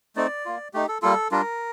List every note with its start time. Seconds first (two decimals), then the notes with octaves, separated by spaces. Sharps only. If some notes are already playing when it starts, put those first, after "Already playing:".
0.16 A3 C4 D#4 D5
0.45 A#3 F4
0.74 A3 D#4 G4
0.88 A4
1.02 G3 A#3 F4 A4
1.31 G3 D4 F4 A#4